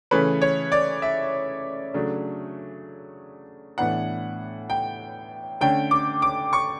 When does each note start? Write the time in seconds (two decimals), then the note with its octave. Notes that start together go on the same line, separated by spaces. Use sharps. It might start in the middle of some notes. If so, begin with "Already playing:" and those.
0.11 C#3 E3 A3 C#4 B4
0.42 C#5
0.72 D5
1.02 E5
1.94 C#3 F#3 A3 D4
3.78 A2 E3 B3 D4 F#5
4.70 G5
5.61 D3 A3 C#4 G5
5.91 D6
6.22 D6
6.53 C#6